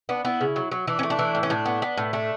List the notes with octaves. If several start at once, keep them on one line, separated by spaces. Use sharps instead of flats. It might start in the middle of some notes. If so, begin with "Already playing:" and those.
B3 D4
B3 E4
C#3
F#3
F#3
E3 D4
C#4
A3
D4
E3
A2
C#4
A2 D4
B3
B3
A2
A3 D4